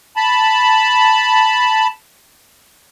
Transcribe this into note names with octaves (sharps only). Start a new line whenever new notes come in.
A5 B5